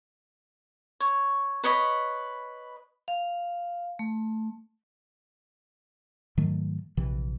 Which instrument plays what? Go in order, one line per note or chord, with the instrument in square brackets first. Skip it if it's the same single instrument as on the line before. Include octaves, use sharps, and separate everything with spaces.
[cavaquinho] C#5
B4 C#5 D#5 B5
[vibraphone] F5
A3
[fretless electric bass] G#2 D#3 F#3 A3
A#1 C3 E3